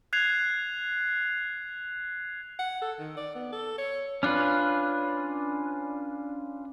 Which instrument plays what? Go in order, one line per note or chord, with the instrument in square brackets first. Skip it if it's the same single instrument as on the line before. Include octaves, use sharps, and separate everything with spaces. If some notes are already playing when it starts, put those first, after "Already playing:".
[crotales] F#6 G#6 C7 F7
[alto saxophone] F#5
A4
D#3
D5
B3
A4
C#5
[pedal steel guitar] C#4 D4 F4 B4